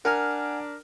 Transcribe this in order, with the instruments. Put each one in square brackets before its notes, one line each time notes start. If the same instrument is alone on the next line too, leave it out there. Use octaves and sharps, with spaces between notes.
[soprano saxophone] D4 [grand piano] A#4 [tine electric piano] F#5 G#5 F6